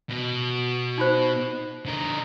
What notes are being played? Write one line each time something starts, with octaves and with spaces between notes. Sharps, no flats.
B2
D#4 F4 C5
D3 A#4